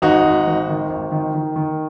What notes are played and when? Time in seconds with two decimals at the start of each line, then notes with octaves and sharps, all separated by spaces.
0.02 G#1 D#4 F#4
0.24 G#1
0.47 G#1
0.69 D#3
0.90 G#1
1.12 D#3
1.35 D#3
1.56 D#3